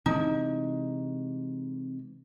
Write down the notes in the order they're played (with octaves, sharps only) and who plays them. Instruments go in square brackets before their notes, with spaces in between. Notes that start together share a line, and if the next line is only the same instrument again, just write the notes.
[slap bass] C3 E3 G#3 [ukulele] D#4